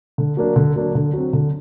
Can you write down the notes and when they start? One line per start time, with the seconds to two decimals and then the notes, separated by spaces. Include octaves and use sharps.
0.18 D3
0.37 F#3 A#3 D4
0.56 D3
0.76 F#3 A#3 D4
0.95 D3
1.13 F#3 C4
1.33 D3